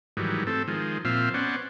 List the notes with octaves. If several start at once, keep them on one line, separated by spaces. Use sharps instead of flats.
G#2 D#3 E3 F#3 G3
A3 C4 A4
D#3 F3 G#3
A#2 F3 C4 E5 F5
B3 C#4 C5 D5 F#5